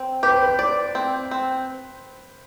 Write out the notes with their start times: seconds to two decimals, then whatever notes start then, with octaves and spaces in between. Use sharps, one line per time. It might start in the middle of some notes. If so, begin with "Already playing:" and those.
Already playing: C4
0.23 G4 B4
0.32 C5
0.43 B4
0.59 D5
0.95 C4
1.31 C4